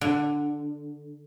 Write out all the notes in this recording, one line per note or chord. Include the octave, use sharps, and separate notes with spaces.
D3